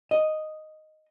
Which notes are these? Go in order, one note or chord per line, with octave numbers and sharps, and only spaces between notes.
D#5